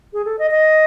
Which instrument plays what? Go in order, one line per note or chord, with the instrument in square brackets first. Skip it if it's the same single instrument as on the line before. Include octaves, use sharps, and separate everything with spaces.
[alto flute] G#4
A4
D#5
D#5